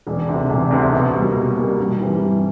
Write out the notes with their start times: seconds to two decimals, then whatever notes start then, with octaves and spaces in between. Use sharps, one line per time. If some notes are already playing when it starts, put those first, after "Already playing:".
0.07 E1
0.28 D2 C3
0.49 E1
0.71 D2 C3
0.93 B2
1.15 G3 A#3
1.36 B2
1.57 G3 A#3
1.79 G2
2.00 E3 G3 C4
2.22 G2